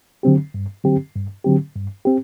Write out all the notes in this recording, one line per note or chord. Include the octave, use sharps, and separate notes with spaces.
D3 F#3 C4 G4
G2
D3 F#3 C4 G4
G2
D3 F#3 C4 G4
G2
C4 G4